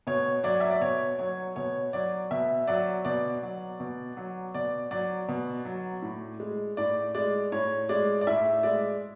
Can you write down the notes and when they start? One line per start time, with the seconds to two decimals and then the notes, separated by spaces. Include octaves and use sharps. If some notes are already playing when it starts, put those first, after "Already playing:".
0.07 B2 C#5
0.44 F#3 D5
0.60 E5
0.70 D5
0.81 B2 C#5
1.19 F#3 C#5
1.56 B2 C#5
1.93 F#3 D5
2.31 B2 E5
2.68 F#3 D5
3.05 B2 D5
3.43 F#3
3.80 B2
4.17 F#3
4.54 B2 D5
4.91 F#3 D5
5.28 B2
5.65 F#3
6.02 A2
6.40 G#3
6.77 A2 D5
7.15 G#3 D5
7.52 A2 C#5
7.89 G#3 D5
8.21 D5
8.27 A2 E5
8.63 G#3 D5